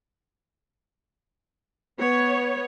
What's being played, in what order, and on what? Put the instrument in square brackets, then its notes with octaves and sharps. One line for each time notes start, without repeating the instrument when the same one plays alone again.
[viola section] B3 C#5